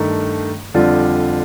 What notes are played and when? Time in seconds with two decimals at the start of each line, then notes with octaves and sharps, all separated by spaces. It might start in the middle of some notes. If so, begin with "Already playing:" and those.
Already playing: G2 D#3 A3 D#4
0.74 F2 D3 G3 D4 F4